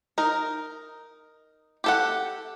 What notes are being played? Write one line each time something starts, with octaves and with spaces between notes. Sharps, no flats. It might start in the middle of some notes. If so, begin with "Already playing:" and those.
D#4 A#4
G4 A4 F#5